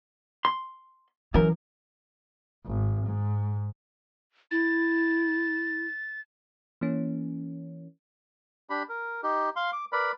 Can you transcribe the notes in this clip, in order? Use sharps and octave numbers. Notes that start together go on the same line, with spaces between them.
C6
F#2 E3 A#4
G#1
G#2
E4 A6
E3 A#3 C#4
D4 G4 B5
A#4
D#4 G4
F5 C6
D6
A#4 B4 D5 B5